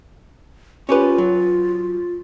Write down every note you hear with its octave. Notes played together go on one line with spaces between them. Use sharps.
C#4 F4 G4 B4
F#3